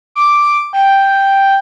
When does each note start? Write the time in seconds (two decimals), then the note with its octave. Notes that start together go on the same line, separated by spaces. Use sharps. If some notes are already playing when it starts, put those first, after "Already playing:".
0.15 D6
0.73 G5